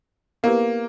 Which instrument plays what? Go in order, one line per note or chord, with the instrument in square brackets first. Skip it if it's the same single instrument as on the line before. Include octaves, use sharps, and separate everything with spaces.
[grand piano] A#3 [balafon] B3 E4 G4 B4